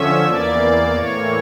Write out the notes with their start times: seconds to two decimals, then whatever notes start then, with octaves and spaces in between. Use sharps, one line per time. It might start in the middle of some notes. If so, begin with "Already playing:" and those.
Already playing: D3 F3 C#4 E5
0.26 E2 E3 A#3 D5
0.94 A2 E3 A#3 C#5